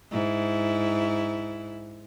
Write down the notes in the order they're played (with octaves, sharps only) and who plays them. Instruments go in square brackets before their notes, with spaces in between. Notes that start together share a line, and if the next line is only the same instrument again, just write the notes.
[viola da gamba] G#2 E4